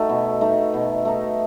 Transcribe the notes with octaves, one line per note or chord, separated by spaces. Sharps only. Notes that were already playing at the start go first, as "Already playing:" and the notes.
Already playing: A3 D#4 F#4
B2
A3 D#4
B2
A3 D#4